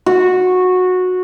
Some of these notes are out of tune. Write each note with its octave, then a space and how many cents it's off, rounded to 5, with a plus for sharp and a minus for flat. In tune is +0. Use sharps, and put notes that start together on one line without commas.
F#4 -15